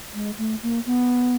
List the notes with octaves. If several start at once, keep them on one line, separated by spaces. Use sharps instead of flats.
G#3
A3
A#3
B3